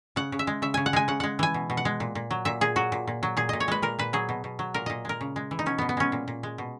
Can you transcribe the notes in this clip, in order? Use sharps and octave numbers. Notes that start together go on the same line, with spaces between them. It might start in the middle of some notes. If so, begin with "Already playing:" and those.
C#3 F#5
C#3
E5
G#3
C#3 E5
C#3 G#5
F#5
G#3 G#5
C#3 F#5
G#3 F#5
E3 G#5
B2
B2
F#5
G#3
A#2
A#2
F#3
A#2 E5
A#2 G#4
F#3 F#4
A#2
A#2
F#3
A#2 G#4
A#2 D#5
C#5
G#3 B4
A#2 A#4
A#2 B4
F#3 G#4
B2
B2
F#3
A#2 A#4
A#2 D#5
G#3 A#4
C#3
G#3
E3
D#4
B2 C#4
B2 B3
B3
G#3 C#4
A#2
A#2
G#3
B2